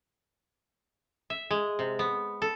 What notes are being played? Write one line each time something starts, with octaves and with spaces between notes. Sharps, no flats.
E5
G#3
C3
B3
A4